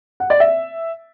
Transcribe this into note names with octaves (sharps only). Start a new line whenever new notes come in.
F#5
D5
E5